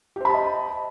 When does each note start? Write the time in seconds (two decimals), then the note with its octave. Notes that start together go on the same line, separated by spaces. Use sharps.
0.16 G4
0.21 C5
0.25 B5
0.30 A5
0.34 D#5